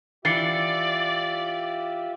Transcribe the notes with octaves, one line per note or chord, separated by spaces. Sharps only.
E3 F4 G4 D5 E5 A6 C7 C#7